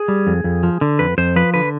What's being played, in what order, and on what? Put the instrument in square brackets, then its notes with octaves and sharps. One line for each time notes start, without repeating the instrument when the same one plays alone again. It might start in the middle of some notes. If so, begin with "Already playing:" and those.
Already playing: [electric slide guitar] G#4
G3
F2
F2
F3
D3
F2 B4
F2 C5
F3 B4
D3 B4